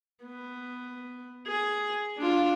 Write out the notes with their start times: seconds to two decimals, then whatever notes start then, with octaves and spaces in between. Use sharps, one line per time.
0.24 B3
1.47 G#4
2.18 D4 F4